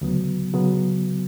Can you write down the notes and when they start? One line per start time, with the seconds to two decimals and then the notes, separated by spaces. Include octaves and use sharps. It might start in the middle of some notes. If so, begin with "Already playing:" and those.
0.01 D2 C#3 F#3 B3
0.54 C#3 F#3 B3